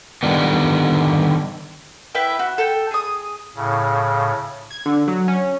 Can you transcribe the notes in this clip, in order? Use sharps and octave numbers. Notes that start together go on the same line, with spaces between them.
D3 D#3 G3 B3
E4 B4 E5 G5
F#4
A4 G5
G#4 D#6
A2 C#3
G#6
D3
F#3
C#4